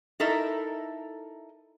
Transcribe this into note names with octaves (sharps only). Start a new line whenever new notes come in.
D#4 E4 A4 A#4 E5